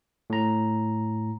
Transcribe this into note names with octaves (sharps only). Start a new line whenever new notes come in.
A2 A#5